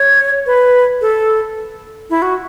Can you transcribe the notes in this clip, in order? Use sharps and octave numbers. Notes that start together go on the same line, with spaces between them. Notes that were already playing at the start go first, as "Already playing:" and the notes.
Already playing: C#5
B4
A4
E4
F#4